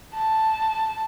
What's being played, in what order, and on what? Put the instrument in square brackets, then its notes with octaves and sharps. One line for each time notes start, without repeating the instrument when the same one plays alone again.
[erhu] A5